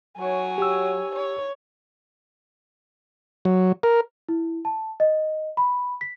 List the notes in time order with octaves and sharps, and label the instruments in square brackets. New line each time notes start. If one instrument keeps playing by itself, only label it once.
[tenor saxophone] F#3 [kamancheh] C#5 G#5
[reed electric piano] G4 E6
[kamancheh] C#5
[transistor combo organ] F#3
A#4
[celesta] E4
A5
D#5
B5
B6